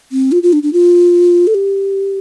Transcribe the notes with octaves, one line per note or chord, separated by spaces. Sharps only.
C4
F4
F4
D4
D4
F4
A4
G4